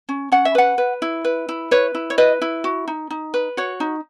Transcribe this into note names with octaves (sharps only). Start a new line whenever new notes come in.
C#4
C#4 F#5
E5
B4 F#5
B4
E4
B4
E4
B4 C#5
E4
C#5
B4 D#5
E4
F#4
D#4
D#4
B4
F#4 C#5
D#4